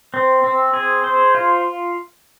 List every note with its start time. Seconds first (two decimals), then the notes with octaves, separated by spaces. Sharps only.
0.14 C4
0.44 C4
0.74 G#4
1.04 C5
1.35 F4